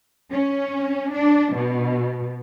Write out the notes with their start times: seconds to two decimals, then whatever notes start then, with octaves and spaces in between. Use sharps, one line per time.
0.31 C#4
1.12 D4
1.54 B2